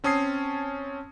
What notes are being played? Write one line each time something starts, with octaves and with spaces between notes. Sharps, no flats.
C4 C#4 A5 D#6 G#6 C7